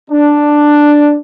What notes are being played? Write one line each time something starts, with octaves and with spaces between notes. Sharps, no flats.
D4